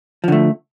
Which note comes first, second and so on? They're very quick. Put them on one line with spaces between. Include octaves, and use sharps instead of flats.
F3 D3 A3